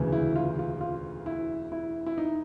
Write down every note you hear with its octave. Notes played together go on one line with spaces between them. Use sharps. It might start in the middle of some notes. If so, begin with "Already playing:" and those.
Already playing: E1 D2 C#3 E3
E4
F4
F4
F4
E4
E4
E4
D#4